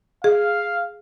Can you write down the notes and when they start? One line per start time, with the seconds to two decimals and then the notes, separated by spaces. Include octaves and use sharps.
0.24 G#4 F5